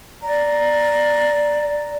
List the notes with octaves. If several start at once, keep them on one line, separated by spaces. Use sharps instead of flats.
D5 A#5